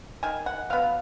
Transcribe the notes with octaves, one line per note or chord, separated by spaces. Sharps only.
D#3 G#5
F#5
F#3 B3 F5